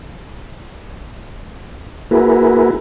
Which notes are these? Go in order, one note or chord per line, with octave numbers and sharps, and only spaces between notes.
A#3 E4 F#4 G#4 A#4 B4